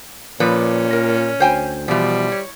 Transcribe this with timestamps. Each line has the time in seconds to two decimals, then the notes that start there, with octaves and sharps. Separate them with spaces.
0.40 A#2 F3 C#4 B4 D5
0.93 A#4
1.40 D2 C5 G5 G#5
1.88 B2 E3 F3 G3
2.32 C#5